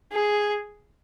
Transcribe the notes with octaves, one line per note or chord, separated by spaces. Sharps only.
G#4